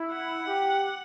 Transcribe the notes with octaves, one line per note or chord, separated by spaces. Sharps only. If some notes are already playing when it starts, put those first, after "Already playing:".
Already playing: E4
F#5
G4